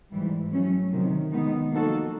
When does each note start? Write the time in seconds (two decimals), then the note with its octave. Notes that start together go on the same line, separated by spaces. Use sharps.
0.12 G#2 E3 G3
0.53 F#3 A3 C#4
0.92 C3 D#3 F#3
1.32 D#3 G#3 B3 D#4
1.71 F3 A#3 D#4 F#4 A4